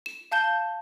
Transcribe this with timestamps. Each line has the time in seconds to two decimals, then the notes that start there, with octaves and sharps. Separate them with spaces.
0.06 E7
0.32 F5 A5 G6 E7 G7